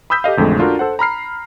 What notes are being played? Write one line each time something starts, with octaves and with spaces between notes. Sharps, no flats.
B5 D#6 E6 G6 B6
G4 A4 D#5 F5
A1 F2 D3 G#3 A3
D4 F4 F#4 A4 A#4
A4 C5 F#5
A#5 B5 F6 C7